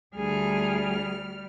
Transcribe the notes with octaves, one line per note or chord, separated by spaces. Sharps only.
D2 G3 G#4 F6